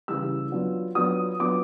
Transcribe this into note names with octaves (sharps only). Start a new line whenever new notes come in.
C#3 E3 G3 E6
F#3 B3 D4 F4
F#3 B3 D4 F4 D#6
F#3 B3 D4 F4 D6